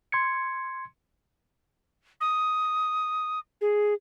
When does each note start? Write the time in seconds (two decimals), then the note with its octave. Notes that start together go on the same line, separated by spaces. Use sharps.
0.12 C6 G#6 C#7
2.21 D#6
3.61 G#4